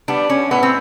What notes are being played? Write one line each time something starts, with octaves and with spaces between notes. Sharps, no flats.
G3 B3 D4
C#4
A2 B3
C4